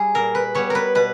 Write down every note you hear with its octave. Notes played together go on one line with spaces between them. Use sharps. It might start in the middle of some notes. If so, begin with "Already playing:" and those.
Already playing: G3 G#4
A#2 A#4
B4
G3 B3 C#5
A#4 B4
B2 B4